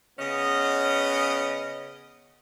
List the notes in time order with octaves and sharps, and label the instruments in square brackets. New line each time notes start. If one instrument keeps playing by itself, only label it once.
[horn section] C#3 B3 C#4 D#5